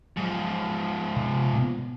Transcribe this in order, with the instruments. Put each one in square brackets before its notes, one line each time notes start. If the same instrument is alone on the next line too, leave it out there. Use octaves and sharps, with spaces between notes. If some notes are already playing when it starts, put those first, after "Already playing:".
[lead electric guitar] G#2 F3 [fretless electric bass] F#3
[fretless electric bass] C3
B2 A#3 B3